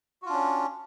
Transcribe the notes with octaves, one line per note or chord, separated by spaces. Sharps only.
C#4 D4 F4 F#4